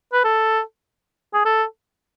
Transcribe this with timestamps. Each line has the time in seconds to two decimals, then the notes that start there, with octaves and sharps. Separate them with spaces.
0.13 B4
0.24 A4
1.34 G#4
1.45 A4